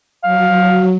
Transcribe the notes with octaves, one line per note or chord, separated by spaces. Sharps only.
F#3 F5